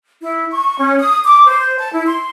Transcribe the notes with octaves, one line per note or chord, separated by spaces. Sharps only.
E4
C#6
C#4
D#6
D6
C5
A5
E4
C6